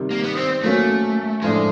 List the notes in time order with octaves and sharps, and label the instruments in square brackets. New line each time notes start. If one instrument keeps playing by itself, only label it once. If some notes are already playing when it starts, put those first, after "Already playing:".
Already playing: [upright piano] C3 D#3 G3
[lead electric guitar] A#3
B3
C4
[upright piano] F#3 A#3 C#4 [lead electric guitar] A3
[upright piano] A2 F3 A3 D4 [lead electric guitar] G#3